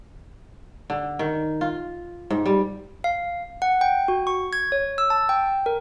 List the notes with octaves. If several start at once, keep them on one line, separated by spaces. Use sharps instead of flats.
D3
D#3
F4
G#2
G3
F5
F#5
G5
F#4
C#6
G#6
C#5
E6
A5
G5
A#4